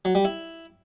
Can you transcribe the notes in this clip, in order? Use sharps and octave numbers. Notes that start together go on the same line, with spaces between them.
F#3
G3
E4